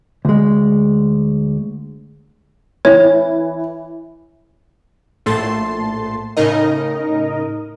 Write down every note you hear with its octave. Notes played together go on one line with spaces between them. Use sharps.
D2 G#3
E3 C#5
A#1 A2 A3 A5 C6
A2 C#3 D#4 A#4 D#5